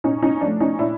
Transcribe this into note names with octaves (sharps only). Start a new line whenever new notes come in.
A#2 C#4 D#4
C#4 D#4
F3 A3 D4
C#4 D#4
A#2 D4 E4